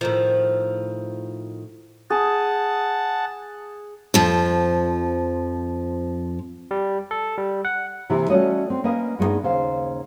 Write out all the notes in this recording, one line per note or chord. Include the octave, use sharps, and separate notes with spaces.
A2 D#3 F3
G#4 F#5 A5
F2 F3
G3
A4
G3
F#5
C3 E3 A#3 E4 G4
G3 A3 C#4 F#4 C#5 D#5
C4
A#3 C#4 B4 D#5
G2 G#3 A3 B3 D#4
D#2 C#3 C5 F5